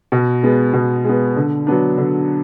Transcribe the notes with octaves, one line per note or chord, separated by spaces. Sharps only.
B2
G#3 B3
B2
G#3 B3
D3
F#3 B3 D4
D3